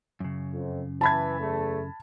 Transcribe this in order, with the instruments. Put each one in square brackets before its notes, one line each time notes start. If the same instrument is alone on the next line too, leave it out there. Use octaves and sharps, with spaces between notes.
[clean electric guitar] F#2 C#3
[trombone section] F2
[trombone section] E3 [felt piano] A5 B5 G#6
[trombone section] E2 A3